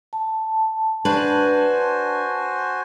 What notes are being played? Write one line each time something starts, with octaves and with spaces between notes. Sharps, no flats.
A5
D4 F#4 B4 C5 G#5